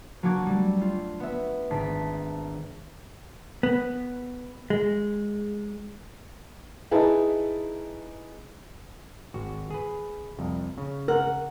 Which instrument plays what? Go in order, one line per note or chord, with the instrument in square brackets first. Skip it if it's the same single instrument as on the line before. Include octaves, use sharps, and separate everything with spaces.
[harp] F#3 A#3 D4 F#4 D6 G#6
G3 A3
F4
B3 E5
G#1 D4 B6
[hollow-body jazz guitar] B3
G#3
[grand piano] D#4 E4 G#4 B4 A5
[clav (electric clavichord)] G#1 F#4
G#4 B4
C2 F2
C#3
[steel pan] A#4 [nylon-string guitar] F#5